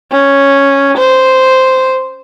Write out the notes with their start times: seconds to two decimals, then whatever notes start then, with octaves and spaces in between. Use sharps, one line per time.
0.11 C#4
0.97 C5